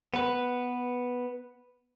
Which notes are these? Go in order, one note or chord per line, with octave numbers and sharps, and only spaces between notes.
B3 B4